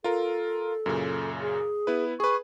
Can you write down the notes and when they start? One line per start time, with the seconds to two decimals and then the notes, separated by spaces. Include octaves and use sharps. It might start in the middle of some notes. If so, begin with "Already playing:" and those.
0.04 F4 A4 A#4
0.86 F#2 A#2 C#3
1.41 G#4
1.87 B3 E4 B4
2.20 G#4 B4 C#6